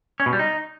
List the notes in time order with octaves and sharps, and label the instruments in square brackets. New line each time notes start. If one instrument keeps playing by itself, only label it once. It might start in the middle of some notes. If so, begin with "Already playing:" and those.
[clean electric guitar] C#4
B2
G3
D#4